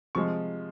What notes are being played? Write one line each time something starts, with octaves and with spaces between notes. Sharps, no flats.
C3 F3 G#3 C#6